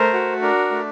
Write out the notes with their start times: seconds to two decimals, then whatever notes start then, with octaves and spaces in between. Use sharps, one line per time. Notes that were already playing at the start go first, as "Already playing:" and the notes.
Already playing: A3 A#4 C5
0.14 F#4
0.42 D4 A#4
0.71 A3